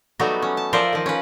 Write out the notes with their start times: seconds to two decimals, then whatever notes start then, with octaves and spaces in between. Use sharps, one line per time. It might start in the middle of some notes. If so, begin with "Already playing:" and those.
0.19 F#3 G3 A3 B3 D#4 F#4
0.42 C#4
0.57 A5
0.73 F3 A#4 C5 D5 E5
0.93 D#3 F3
1.06 C#4 B4